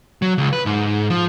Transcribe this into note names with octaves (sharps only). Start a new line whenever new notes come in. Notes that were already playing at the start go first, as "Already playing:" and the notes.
F#3
C#2
B4
G#2
F3